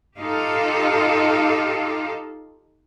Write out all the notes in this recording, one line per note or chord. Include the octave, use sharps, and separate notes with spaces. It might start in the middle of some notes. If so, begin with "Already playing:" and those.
D#4 F4 G4 A4 F5